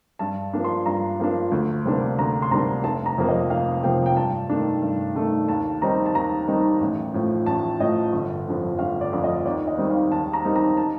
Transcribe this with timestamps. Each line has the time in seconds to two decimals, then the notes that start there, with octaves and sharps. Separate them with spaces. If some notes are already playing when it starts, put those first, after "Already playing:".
0.19 G2 A5
0.53 F3 A#3 D4
0.64 C6
0.86 G2 A#5
1.19 F3 A#3 D4
1.51 D2
1.85 C3 G3 A#3 D4
2.18 D2 A#5
2.42 C6
2.51 C3 G3 A#3 D4 A#5
2.84 F1 A5
3.06 A#5
3.18 F2 C3 F3 A#3
3.28 D#5
3.50 F1 F5
3.83 F2 C3 F3 A#3 G5
4.06 G5
4.17 G2 A5
4.50 D#3 A3 D4
4.82 G2
5.16 D#3 A3 D4
5.48 D#2 A5
5.82 D#3 G3 C4 D#4 A#5
6.06 A5
6.14 D#2 A#5
6.48 D#3 G3 C4 D#4
6.81 A1
7.14 A2 F3
7.46 A1 A5
7.80 A2 F3 D#5
8.13 G1
8.46 F2 D3 F3
8.79 G1 F5
9.01 D5
9.13 F2 D3 F3
9.24 D#5
9.45 D#2 D5
9.67 D#5
9.78 D#3 G3 C4 D#4
9.90 F5
10.11 D#2 A5
10.33 A#5
10.45 D#3 G3 C4 D#4
10.56 A#5
10.77 A5